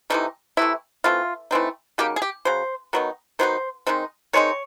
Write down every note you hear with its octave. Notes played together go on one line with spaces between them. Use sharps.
C3 E3 A3 D#4
C3 E3 A3 E4
E3 A3 C4 D#4 F4
E3 A3 C4 D#4
C#3 F#3 A#3 D#4 G4
G#4
G4
C#3 F#3 C5
D#3 F#3 B3 D#4
D#3 F#3 B3 D#4 C5
D#3 G#3 C4 D#4
D#3 G#3 C4 D#4 C#5